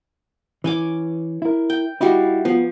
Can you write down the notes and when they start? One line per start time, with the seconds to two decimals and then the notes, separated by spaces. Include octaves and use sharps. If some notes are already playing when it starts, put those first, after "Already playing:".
0.64 E3 C#4 G#5 D6
1.42 E4 A#4
1.70 G5
2.01 G3 D#4 E4 F#4 F5
2.45 F3 B3